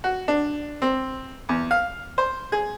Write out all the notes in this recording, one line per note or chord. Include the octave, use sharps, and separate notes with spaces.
F#4
D4
C4
E2
F5
C5
G#4